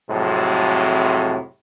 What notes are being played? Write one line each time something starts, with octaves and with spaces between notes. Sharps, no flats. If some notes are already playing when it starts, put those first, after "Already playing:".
F2 A2 C3 F#3 G#3